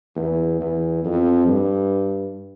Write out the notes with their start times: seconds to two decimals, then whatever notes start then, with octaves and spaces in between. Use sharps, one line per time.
0.16 E2
0.60 E2
1.05 F2
1.48 G2